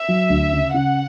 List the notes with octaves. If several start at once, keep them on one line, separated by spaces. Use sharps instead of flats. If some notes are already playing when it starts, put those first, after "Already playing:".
Already playing: E5
F#3
D2
C#3
C#3 F#5